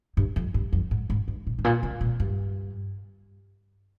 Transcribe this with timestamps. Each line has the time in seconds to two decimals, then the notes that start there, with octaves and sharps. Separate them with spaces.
0.17 G2
0.36 F2
0.54 G2
0.73 F2
0.91 G#2
1.10 G#2
1.28 G2
1.47 A#2
1.59 G#2
1.64 A#2
1.83 C3
2.01 A#2
2.20 G2